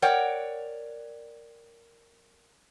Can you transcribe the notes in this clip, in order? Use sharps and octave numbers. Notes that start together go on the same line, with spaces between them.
A#4 C#5 D5 F#5 G5